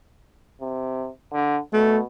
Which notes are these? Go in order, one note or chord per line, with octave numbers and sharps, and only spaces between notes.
C3
D3
B2 A3